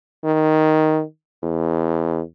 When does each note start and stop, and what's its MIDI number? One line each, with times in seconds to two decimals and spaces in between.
0.24 1.02 51
1.43 2.21 40